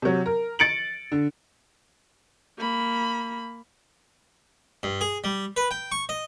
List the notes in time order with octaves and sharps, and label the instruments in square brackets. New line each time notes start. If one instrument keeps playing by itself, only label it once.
[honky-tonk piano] C3 F#3
A#4
A6 C#7 D7 F#7
D3
[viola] A#3 B5
[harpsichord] G2
G#4
G3
B4
G5
C#6
D#5